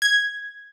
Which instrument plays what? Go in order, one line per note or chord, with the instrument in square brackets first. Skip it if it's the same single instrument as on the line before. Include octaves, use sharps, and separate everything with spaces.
[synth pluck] G#6